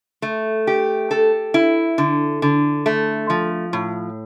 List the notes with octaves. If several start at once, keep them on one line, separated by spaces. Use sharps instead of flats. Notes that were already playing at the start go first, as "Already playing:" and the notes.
A3
G4
A4
E4
D3
D3
A3
F3
A2